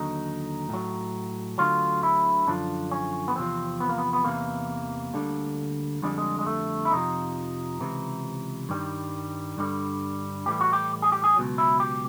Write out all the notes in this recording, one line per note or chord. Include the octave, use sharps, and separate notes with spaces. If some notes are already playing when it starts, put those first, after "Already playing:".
Already playing: D#2 D3 F#3 D#4
A2 F#3
D2 D3 F#3 F4
E4
F#2 D3 F3 D4
C#4
B3
E2 C3 F3 C4
B3
A#3
B3
B3
E2 C3 E3 A#3
D2 D3 G3
F2 D3 G3 G#3
G#3
G#3
A3
E4
F2 C3 F3 D#4
C#2 C3 E3
G2 D#3 G3
G2 D3 G3
A2 E3 G3 G4
F#4
G4
G#4
G4
G#4
C#2 B2 F#3
E4
G4